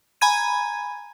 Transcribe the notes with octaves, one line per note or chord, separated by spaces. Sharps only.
G#5 A#5 B5 G#6 D#7